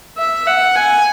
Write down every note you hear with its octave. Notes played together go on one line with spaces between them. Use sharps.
E5
F#5
G#5